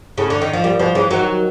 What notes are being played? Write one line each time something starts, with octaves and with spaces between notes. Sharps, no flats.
A2 C#3
D3
D#3
F3
A#2 G3
B2 F3
C#3 E3
D#3 F#3